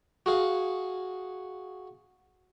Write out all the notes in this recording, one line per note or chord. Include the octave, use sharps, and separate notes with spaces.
F#4 G#4 F5